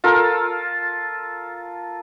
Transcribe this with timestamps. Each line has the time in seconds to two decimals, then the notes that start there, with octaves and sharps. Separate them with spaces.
0.04 F4 A4 A#4